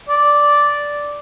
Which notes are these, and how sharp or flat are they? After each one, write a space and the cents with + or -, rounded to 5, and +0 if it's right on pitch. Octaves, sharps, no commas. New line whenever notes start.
D5 -5